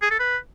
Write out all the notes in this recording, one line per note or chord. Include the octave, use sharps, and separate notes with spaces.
G#4
A4
B4